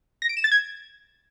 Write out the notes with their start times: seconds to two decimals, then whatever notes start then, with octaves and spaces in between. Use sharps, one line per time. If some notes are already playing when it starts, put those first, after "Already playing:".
0.22 A#6
0.29 D7
0.37 E7
0.44 A6
0.52 G#6